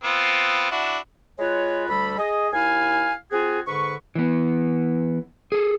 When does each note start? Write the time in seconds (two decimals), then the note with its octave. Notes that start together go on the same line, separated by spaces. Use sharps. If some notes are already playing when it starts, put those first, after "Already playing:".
0.04 B3 C4 F4
0.71 D4 E4 F#4
1.39 G#3 F4 F#4 B4 C#5
1.89 D2 G3 A4 B5
2.18 G#4 D#5
2.52 D#2 E4 F5 G#5
3.32 C4 F4 F#4 G#4
3.67 G#2 D3 B4 C#6
4.15 E3 B3
5.52 G#4 A4